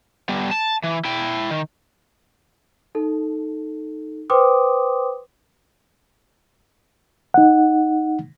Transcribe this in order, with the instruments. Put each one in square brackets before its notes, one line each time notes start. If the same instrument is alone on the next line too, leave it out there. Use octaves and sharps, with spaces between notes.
[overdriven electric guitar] G3 B3
A5
E3
E4 G5
D#3
[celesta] D#4 A4
B4 C5 G5 C6 D6 D#6
[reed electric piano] D#4 F#5